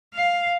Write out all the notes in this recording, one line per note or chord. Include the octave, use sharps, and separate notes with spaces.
F5